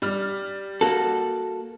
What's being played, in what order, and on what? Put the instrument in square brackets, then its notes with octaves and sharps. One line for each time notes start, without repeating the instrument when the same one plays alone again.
[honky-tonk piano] G3 F6
[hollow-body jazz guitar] A#3 F#4 A4